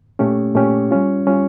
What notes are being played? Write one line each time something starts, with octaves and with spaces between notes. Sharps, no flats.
A#2 A3 C#4 G4
A#2 A3 C#4 G4
G3 C#4 F4
G3 C#4 F4